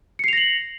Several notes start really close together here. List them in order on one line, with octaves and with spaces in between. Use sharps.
C#7 C7 F7 A#6 F#7